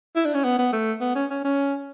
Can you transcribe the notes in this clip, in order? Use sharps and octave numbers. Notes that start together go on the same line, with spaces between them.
E4
D4
C#4
B3
B3
A3
B3
C#4
C#4
C#4